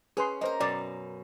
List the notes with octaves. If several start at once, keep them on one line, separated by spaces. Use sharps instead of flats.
C#4 G#4 B4 C6
A#3 A#4 C5 D#5
F#2 B2 D5